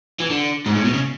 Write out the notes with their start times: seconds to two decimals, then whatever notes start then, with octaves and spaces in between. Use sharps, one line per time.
0.20 E3
0.30 D3
0.66 G#2
0.75 A2
0.85 B2
0.94 C#3